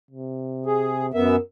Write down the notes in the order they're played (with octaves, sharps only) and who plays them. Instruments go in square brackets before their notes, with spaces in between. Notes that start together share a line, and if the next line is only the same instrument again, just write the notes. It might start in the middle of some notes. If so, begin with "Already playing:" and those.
[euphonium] C3
[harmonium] G#4
[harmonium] F#2 B3 E5 [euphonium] A#4